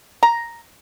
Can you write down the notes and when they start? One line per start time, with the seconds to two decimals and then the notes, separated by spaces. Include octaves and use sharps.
0.23 A#5